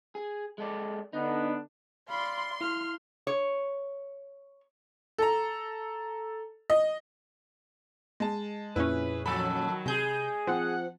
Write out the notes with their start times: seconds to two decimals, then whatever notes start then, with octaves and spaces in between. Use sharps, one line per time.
0.15 G#4
0.58 G#3 A4 D5
1.13 D3 B3 D4 D#4
2.10 D5 F5 B5 C6
2.61 E4 F5 F6
3.27 C#5
5.18 A4 A#5
6.70 D#5
8.20 G#3 A5
8.76 F2 A#2 C#4 E4 G#4 B4
9.26 D#3 F3 F#3 A4 B5
9.86 C3 G#3 G#4 G6
10.47 F3 C4 F#5